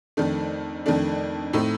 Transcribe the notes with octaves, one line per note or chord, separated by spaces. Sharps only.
F2 D#3 A3 D4
F2 D#3 A3 D4
A2 A3 C4 D#4